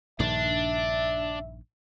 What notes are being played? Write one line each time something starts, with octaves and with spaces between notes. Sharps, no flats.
A#1 G2 D#3 D4 E5